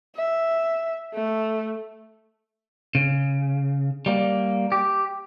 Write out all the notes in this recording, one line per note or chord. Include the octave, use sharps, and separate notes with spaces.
E5
A3
C#3
G3 A#3
G4